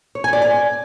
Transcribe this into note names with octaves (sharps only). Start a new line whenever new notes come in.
C#5
G#5
D5
G#5